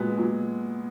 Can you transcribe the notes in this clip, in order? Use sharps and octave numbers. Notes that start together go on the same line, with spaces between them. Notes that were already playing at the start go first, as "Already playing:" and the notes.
Already playing: A#2 F#3 G#3 B3
A#2 F#3